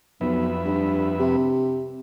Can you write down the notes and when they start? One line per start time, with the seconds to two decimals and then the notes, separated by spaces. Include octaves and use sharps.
0.21 B1 F2 B4 E5
0.65 G2
1.19 C3